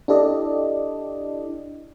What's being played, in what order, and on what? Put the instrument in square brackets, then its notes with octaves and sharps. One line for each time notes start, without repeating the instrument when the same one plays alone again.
[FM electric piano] D4 E4 G4 A4 D5 D#5